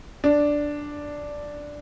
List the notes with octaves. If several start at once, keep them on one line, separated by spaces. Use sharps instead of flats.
D4